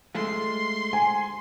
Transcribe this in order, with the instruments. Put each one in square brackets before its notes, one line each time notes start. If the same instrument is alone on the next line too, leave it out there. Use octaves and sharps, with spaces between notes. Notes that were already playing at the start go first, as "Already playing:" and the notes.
[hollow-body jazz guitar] G#3 A3 F4 [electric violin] C6
[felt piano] G#5